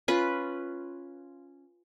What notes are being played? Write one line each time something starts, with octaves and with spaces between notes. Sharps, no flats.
C#4 F4 B4